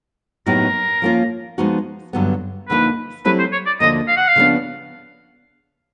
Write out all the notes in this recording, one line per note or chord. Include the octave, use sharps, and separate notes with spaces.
A2 F#3 B3 D#4 G4 A#4
F3 A#3 C#4 F4
F3 G#3 B3 D#4 F#4
G2 D3 F#3 B3
D2 D3 F3 A#3 D#4 B4
F#3 A3 C4 E4 G4 B4
C5
C#5
D5
D2 D3 F3 A#3 D#5
F5
F#5
F5
C#3 F3 G#3 B3 D4